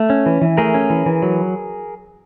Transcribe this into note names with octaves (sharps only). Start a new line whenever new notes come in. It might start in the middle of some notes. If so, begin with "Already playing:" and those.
Already playing: A3
C#4
E3
E3
A3 G#4 A#4
C#4
E3
E3
F#3